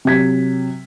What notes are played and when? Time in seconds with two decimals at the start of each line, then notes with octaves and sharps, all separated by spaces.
0.05 C3 F#3 G#6 B6